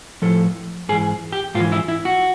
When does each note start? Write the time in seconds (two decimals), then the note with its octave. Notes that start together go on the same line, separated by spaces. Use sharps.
0.22 A2 F3 A4
0.89 G#2 G#4
0.92 E3
1.32 G4
1.55 G#2 F4
1.60 E3
1.72 E4
1.88 E4
2.05 F#4